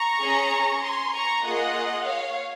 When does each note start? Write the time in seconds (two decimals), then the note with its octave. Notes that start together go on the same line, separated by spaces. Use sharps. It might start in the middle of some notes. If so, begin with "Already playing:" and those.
Already playing: A#5 C#6
0.21 C#4 G#4
0.82 G#5 C6
1.13 A#5 C#6
1.43 A#3 F4 G#4 D#5 F#5
2.05 C#5 F5